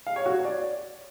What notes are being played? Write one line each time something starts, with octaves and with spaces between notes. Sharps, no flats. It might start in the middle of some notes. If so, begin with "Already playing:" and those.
F5
C#5
F#4
C#5
D5